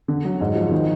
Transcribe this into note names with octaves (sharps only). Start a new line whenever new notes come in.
D3
F#3
G#2
F3
D#3